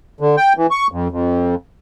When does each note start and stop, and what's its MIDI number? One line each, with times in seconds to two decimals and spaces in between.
0.20 0.36 50
0.37 0.53 79
0.57 0.67 52
0.71 0.87 85
0.92 1.08 41
1.11 1.55 41